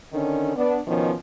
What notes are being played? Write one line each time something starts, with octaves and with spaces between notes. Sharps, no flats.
D3 D#3 C#4 D4
B3 D4
B2 D#3 F3 C#4